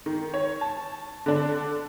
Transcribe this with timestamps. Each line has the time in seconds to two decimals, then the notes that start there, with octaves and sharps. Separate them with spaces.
0.06 D#3
0.34 C#5
0.61 A5
1.26 D3 D4